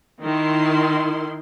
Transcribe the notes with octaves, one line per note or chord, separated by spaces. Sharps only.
D#3 E4 C6